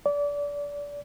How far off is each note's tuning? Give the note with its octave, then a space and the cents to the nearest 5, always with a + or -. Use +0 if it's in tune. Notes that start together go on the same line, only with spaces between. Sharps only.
D5 -25